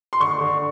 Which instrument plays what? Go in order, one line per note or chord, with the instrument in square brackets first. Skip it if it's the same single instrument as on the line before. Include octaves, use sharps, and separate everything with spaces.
[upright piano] C6
D3 C#6
D3